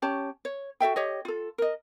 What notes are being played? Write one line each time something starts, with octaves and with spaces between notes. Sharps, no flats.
C#4 G4 C#5 A5
C#5
F#4 A4 E5 G5
G4 C#5 D#5
F4 A4
A#4 D#5